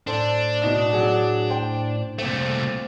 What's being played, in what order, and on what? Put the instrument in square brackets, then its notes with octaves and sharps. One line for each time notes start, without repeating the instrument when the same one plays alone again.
[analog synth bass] A2 [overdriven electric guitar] D4 [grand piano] A4 C5 A5
[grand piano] B2 D#4 E7
F#3 G#4 F#5
C5 G5
[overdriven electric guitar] C2 A3 [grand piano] A#2 C4